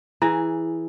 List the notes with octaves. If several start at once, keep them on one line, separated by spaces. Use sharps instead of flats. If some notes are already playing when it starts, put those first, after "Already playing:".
E3 E4 G#4